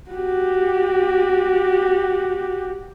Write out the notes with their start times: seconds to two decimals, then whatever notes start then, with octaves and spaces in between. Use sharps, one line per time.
0.10 F#4 G4